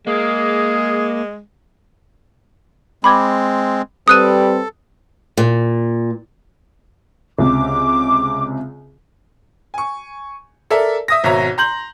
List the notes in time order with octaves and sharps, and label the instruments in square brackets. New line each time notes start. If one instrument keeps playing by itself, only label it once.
[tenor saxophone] G#3 [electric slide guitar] A#3 [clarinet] G#4
[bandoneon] G#3 C4 [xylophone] B5 D6 G#6
[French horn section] G3 C4 B4 [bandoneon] A4 [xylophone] D#6 F#6 D#7
[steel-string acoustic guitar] A#2
[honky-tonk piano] C#2 C3 [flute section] D6
[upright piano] G#5 C#6
A4 A#4 D5 E5
E5 D#6 A#6
G#1 B2 C#5 E5 A#5
A#5 C6 G6 F#7